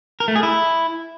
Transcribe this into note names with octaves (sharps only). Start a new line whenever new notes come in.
A#4
A3
G#4
E4